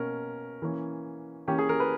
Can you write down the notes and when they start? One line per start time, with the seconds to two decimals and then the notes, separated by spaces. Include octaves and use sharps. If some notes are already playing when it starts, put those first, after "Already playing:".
Already playing: B2 A#3 C#4 A#4
0.62 E3 A#3 C#4
1.48 E3 A#3 C#4 G4
1.59 G#4
1.69 A#4
1.80 B4